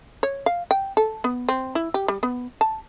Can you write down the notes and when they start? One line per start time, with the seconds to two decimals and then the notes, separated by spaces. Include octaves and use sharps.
0.23 C#5
0.46 F5
0.71 G5
0.97 A4
1.24 B3
1.49 C4
1.75 E4
1.94 G4
2.08 G3
2.23 B3
2.61 A5